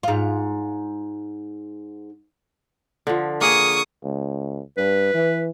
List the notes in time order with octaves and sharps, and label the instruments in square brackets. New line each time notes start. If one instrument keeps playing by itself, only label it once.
[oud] G#2 F4
[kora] D3 F3
[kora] A#3 G#4 [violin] C#6 D#6
[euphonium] C#2
[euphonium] G2 [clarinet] B4
[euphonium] E3